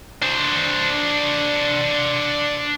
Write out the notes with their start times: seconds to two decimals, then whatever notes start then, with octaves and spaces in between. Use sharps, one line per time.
0.22 D4 C5